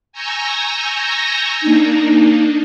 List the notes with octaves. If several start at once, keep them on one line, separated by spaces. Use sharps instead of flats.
G#5 A#5 C#6 E6 G6 A#6
A#3 D4 D#4